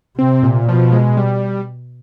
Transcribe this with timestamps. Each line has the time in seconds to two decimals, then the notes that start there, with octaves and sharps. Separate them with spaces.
0.18 C3 C4
0.43 A#2
0.68 B2 F3
0.92 G#3
1.17 G3